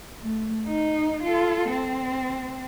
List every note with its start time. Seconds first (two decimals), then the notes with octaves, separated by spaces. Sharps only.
0.20 A3
0.67 D#4
1.23 F4 A4
1.70 C4